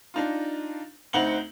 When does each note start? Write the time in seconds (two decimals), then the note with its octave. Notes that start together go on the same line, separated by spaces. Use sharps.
0.14 D4 D#4 F4
1.13 D2 C4 D#4 F#5 F#7 G7